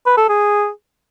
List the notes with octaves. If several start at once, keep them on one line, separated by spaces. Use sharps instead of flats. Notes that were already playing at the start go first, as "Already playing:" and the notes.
B4
A4
G#4